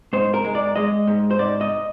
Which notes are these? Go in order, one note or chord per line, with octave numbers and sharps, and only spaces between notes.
G#2 C5
A#4
G#3
D5
G#3 D#5
G#2
C5
G#2 D5
D#5